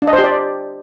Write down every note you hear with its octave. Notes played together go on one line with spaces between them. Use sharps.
D4
D#5
C5
G4
D5